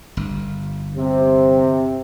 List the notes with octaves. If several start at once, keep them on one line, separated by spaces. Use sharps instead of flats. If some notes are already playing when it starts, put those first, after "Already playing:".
G1
C3